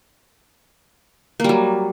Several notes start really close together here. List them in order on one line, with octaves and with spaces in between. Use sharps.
A#3 G3 F#3